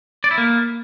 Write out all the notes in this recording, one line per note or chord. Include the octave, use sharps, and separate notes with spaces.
D5
E4
A#3